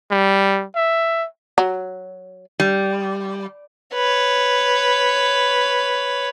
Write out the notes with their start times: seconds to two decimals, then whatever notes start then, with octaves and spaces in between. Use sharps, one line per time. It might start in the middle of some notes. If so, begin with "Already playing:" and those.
0.11 G3
0.76 E5
1.58 F#3
2.60 G3
3.94 B4 C#5